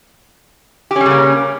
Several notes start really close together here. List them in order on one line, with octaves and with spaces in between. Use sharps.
G4 C#4 G3 C#3 A#3